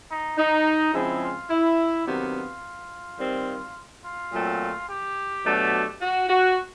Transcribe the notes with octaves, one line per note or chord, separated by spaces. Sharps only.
D#4
D#4
C#3 F3 G#3 C4 E4
F4
E4
C3 D#3 F#3 B3 D4 F4
D#3 G3 C4
F4
A#2 F#3 A3 C4
G4
B2 F#3 A3 D4
F#4
F#4